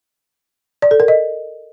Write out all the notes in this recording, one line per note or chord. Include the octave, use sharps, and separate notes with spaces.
D5
A4
A#4
D#5